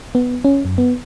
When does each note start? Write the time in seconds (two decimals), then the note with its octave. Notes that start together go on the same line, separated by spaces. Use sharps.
0.15 B3
0.45 C#4
0.65 F#2
0.78 B3